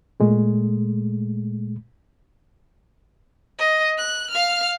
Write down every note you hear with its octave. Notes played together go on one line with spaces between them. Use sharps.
A#2 G#3 A3
D#5
F#6
F5 F6